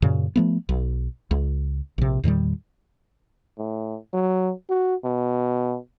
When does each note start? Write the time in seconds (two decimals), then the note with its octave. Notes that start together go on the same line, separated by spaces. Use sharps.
0.02 F#2 A#2 C#3
0.36 F3 A3 B3
0.69 B1
1.31 C#2
1.98 A#1 C3
2.24 E2 A#2 D#3 G3
3.58 A2
4.13 F#3
4.70 F#4
5.05 B2